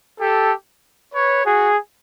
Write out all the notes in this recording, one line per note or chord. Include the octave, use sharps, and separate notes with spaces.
G4 A4
B4 C#5
F#4 G#4